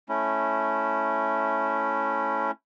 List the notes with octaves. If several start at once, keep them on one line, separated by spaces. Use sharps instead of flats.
A3 C#4 E4